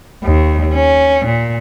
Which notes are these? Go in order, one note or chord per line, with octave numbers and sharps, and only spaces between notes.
D#2
C#4
A#2